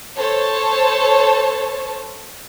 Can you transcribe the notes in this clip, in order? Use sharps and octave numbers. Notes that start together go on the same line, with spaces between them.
A4 C5 C#5 A5